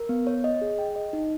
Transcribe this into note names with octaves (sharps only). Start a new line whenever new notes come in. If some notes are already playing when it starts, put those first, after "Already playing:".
Already playing: A#4
B3
C#5
D#5
G#4
G5
D#5
D#4